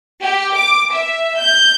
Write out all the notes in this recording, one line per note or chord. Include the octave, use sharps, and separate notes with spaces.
G4
D6
E5
G6